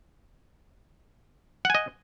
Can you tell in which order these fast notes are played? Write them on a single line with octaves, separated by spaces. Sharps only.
F#5 G#5 D#5